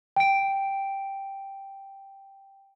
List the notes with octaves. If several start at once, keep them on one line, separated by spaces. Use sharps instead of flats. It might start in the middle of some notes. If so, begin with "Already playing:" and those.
G5 D7